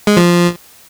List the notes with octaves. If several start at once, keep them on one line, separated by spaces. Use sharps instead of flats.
G#3
F3